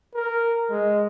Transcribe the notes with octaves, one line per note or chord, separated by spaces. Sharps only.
A#4
G#3